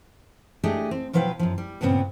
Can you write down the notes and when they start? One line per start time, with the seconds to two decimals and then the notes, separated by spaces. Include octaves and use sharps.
0.63 A3 D4 G4 G#4 D#5
0.91 C4
1.13 B2 F3 F#3 B4 F5 G5
1.39 F#2 F3
1.58 G3
1.81 G2 A#2 C#3 B3 C4